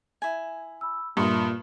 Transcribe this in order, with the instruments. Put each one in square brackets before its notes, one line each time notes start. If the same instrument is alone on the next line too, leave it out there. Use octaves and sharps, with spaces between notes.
[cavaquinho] E4 G#5
[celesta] B5 E6
[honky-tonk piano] G2 [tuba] A#2 [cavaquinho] E5 [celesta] C6 D#6 C#7